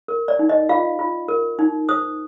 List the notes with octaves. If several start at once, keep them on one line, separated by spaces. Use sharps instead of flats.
A#4
D5
D#4
D#5
F4 F5
F4
A#4
D#4
C5 D#6